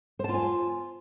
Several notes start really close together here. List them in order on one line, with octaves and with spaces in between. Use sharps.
C5 A5 F4 G#5